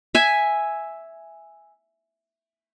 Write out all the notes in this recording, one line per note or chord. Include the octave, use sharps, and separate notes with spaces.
E5 G#5